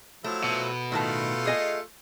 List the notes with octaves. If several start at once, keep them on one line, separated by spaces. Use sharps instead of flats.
F3 F#3 A3 E4
B2
A2 D#3 A3 F4 A5
G#4 D#5 G#5